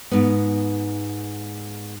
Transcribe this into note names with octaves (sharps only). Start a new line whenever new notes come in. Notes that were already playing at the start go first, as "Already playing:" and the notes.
G#2 B3